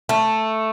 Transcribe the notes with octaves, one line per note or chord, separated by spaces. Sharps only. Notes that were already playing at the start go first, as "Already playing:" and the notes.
A3